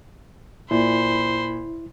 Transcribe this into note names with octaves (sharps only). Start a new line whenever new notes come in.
A#2 E4 C5 B5